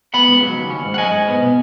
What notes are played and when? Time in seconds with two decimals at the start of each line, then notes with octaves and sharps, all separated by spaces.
0.14 B3 F#5 B5
0.28 C#2
0.43 F#3
0.57 D#2
0.70 C#4
0.85 G#2
0.94 F#5
0.98 F#3 D#5 G#5
1.13 G#2
1.28 B3
1.42 B2